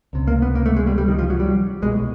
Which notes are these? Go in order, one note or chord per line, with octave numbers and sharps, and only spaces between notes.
C#2 C3
A#3
B3
A#3
A3
G#3
G3
G3
D#3
F3
F#3
G3
C2 B2 G#3